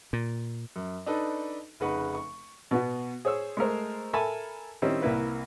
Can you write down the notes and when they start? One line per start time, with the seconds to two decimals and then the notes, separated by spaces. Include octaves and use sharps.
0.13 A#2
0.76 F#2
1.06 D4 D#4 A4 B4
1.80 F1 C#3 D#4 B4 F#5 C#6
2.15 C#6
2.71 B2 B3 F#4
3.25 G#4 C5 C#5 E6
3.57 G#3 A3 A#4 C5
4.13 A4 A#4 E5 G#5 A5 B5
4.82 D#3 G3 C4 C#4 D#4 E4
5.02 C2 A#3 E4 B4